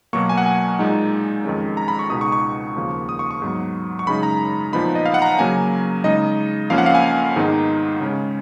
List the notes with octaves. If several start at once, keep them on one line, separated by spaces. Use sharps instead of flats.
B2 F#3 A#3 C#6
G#5
F#5
G#5
A#2 G#3 D#4
F2 D#3 G#3 C#4
A#5
B5
C#6
C#2 B2 G#3 D#4 D#6
C#6
C#6
D#2 C#3 F3 A#3
D#6
C#6
C#6
G#2 F#3 B3
C#6
F#2 C#3 G#3 D#4 B5
A#5
A#2 F3 B3 D#4 B5
D#5
F5
F#5
A#5
C#3 F#3 A#3 C#4 G#5
C#3 G#3 D#4 D#5
F2 F3 A#3 C#4 F5
F#5
F5
G#5
G#2 D#3 G#3 B3 D#4
C#3 G#3 C#4